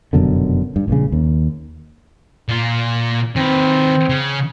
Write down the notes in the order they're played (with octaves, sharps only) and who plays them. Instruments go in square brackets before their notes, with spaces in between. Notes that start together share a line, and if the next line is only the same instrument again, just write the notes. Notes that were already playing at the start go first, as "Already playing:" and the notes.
[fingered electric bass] F1 F#2 B2 D3
G2
A#1 G2 C#3
D#2
[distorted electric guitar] A#2 F4
[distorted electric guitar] D#3 B4 [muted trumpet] C4
[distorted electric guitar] C#3